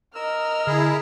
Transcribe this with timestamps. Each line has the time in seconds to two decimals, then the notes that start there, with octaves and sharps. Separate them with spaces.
0.15 A#4 D#5 E6 F6
0.67 D3 E4 G#4